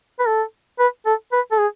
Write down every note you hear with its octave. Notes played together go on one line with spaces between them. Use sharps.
B4
A4
B4
A4
B4
A4
G#4